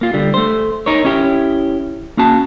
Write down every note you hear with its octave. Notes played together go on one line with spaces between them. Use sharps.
A#3 F4
D3 G3
A3 C5
D#4 A#4 C#5
C#4 E4 G4
A#3 C#4 F#4 A5